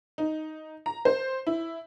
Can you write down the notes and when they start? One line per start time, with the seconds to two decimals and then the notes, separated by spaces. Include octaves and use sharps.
0.18 D#4
0.86 A#5
1.05 C5
1.47 E4